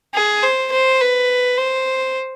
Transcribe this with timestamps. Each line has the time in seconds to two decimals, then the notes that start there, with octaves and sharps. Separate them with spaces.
0.14 G#4
0.43 C5
0.71 C5
1.00 B4
1.57 C5